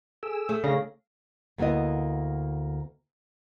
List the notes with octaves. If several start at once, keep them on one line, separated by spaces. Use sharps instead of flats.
G#4 A4 E6
A3
C#3 D4 A4 F5 A#6
D2 A#3 B3 E4 D#5